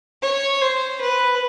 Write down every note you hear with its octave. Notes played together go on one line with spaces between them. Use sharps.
C#5
C5
B4